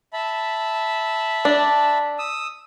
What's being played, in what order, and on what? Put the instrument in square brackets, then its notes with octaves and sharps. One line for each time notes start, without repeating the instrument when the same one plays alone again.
[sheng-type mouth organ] E5 A5 B5
[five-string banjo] D4
[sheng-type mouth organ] D#6 E6